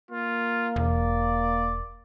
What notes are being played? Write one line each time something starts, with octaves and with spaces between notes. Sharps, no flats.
A#3 F4
E1 D5